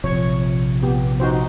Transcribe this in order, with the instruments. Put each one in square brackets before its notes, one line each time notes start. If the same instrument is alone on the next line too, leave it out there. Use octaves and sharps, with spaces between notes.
[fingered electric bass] A#1 C3 F3 [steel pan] C#5
[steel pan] B3 G4
D#4 F#4 C5